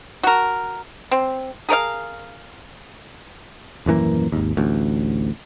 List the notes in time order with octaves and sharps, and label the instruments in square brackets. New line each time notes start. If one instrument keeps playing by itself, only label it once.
[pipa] F#4 A#4
C4
G#4 A#4 D5 F5
[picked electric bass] D#1 F#2 E3 A#3
G#1 D#2
A1 D2